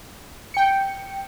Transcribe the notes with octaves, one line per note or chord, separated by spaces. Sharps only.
G5 C#7